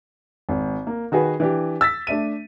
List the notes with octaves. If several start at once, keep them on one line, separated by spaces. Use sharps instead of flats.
G#1
A#3
D#3 F#4 G#4 B4
E3 D4 G4
E6 A6 B6
A3 D4 E5 D#7